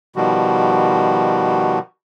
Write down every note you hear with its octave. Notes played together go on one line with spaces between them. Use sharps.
B2 D#3 F3 G3 F#4